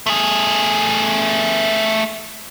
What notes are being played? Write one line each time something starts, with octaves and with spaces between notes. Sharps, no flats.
A3 G#4